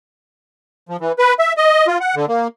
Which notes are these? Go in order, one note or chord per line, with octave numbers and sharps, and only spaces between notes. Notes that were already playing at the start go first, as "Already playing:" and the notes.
F3
E3
B4
E5
D#5
F4
F#5
D3
A#3